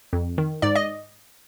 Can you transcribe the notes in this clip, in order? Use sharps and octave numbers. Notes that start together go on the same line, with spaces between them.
F2
D#3
G#2 D5
D#5